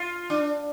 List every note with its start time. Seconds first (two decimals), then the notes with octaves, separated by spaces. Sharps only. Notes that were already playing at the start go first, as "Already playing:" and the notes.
Already playing: F4
0.30 D4